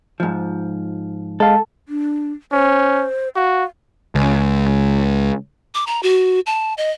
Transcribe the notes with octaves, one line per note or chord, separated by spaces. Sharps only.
G#2 F3
G#3 A4 F5
D4
C#4 C5
F#4 F5
C#2
D6
A#5
F#4
A5
D#5